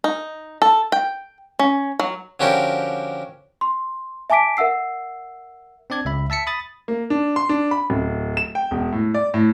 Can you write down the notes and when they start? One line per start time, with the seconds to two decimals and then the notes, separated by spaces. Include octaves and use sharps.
0.04 D#4
0.62 A4
0.92 G5
1.59 C#4
1.99 F#3
2.40 D3 F3 C#4 F#4 G4 A#4
3.61 C6
4.30 E5 G#5 A5 D6 B6 D7
4.57 A#4 E5 F#5 E6 C7
5.90 C4 D4 D5 G#6
6.05 C#2 E5 B5
6.30 E5 A5 B6 C#7
6.47 B5 D#6 A6
6.88 A#3
7.10 D4
7.36 C6
7.49 D4
7.71 B5
7.90 D1
8.37 E7
8.55 G5
8.71 E1
8.92 A2
9.14 D5
9.34 A2